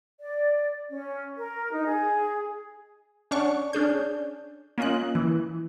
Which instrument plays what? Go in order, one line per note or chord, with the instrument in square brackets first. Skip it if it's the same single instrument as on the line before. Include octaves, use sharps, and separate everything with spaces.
[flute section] D5
C#4
A#4
D#4
G#4
[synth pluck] C#4 D4 F#5 C#6
C#4 D4 G#4 G6
A#3 C#4 F4 D#5 F#6
E3